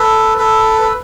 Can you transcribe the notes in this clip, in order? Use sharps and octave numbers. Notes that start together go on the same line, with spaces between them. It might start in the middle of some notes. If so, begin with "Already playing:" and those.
Already playing: A4 B4
A4 B4
B4